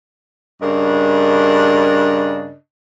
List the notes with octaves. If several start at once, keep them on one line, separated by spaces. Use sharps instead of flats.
G2 C#3 D4 A#4 D#5